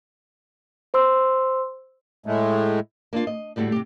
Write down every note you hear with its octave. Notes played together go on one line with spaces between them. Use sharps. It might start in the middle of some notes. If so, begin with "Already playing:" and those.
C5 C6 E6
A2 G#3 A3
A#3 D4 D#4 F4
D#5
D2 A2 G3 A3 F#4
C3 G4